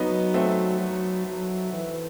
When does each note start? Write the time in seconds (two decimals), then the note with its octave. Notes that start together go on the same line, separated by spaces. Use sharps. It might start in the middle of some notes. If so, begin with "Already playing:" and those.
Already playing: F#3 B3 D#4
0.34 A3 C4
0.81 F#3
1.27 F#3
1.73 E3